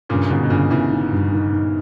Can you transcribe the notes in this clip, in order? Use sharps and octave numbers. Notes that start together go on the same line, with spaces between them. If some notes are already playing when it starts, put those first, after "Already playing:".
G2 A#2 C#3
C#3
G1 G#2 B2
B2
G1 A#2 C#3
G1 C#3 E3
D#3
G2
D#3
D#3